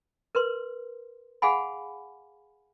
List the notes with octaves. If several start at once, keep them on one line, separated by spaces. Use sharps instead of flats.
A#4 B4 C6
G#4 F5 F#5 G#5 B5